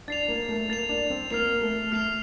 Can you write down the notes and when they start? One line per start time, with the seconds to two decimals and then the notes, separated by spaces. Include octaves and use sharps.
0.08 D4 A6 C7 F7
0.28 A#3
0.49 A3
0.69 A#3 A6 C7 F7
0.89 D4
1.10 C4
1.31 A#3 F6 C7 F7
1.61 A3
1.92 A3 F6 C7 F7